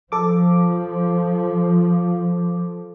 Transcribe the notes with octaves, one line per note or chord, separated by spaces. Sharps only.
F3 A4 D6